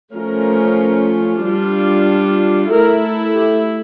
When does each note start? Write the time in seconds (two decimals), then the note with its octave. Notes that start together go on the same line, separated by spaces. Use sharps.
0.15 F3 A3 C#4 F4 A#4
1.43 G3 D4 F4
2.72 A3 E4 A#4
3.04 A4
3.35 G4